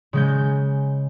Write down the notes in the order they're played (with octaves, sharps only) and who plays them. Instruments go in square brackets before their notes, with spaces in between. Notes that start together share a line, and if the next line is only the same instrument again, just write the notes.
[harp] C#3 G#3 G6